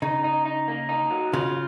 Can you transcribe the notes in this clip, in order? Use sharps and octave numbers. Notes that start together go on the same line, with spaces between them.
C#3 D#4
D#4
D#4
A#3
D#4
F#3
C#3 F4